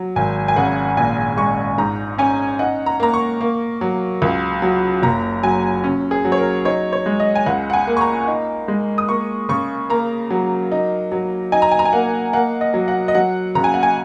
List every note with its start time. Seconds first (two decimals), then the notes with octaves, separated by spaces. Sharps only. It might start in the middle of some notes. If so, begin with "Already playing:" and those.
Already playing: F#3
0.16 G#1 G#5
0.48 G#5
0.56 C#3 F#5
0.97 A#1 G#5
1.37 G#3 C#6
1.78 G#2 A#5
2.18 C#4 G#5
2.59 D#4 F#5
2.86 A#5
3.00 A#3 A#5
3.14 C#6
3.41 A#3
3.81 F#3
4.22 C#2
4.62 F#3
5.03 F#1 A#5
5.43 F#3 G#5
5.84 C#4
6.11 G#4
6.25 F#3
6.32 C#5
6.38 A#4
6.65 D#4 C#5
6.92 C#5
7.06 G#3
7.20 D#5
7.35 G#5
7.46 C#2 F#5
7.70 F#5
7.73 G#5
7.87 A#3
7.97 C#6
8.01 A#5
8.28 D#4
8.68 G#3
8.98 D#6
9.09 A#3 C#6
9.49 C#3 C#6
9.90 A#3 A#5
10.31 F#3
10.72 D#4
11.12 F#3
11.52 D#4 G#5
11.62 A#5
11.71 G#5
11.79 A#5
11.85 G#5
11.93 A#3 F#5
12.33 A#3 F#5
12.61 D#5
12.74 F#3
12.88 F#5
13.08 D#5
13.15 F#3 F#5
13.55 C#3 A#5
13.64 G#5
13.74 F#5
13.83 G#5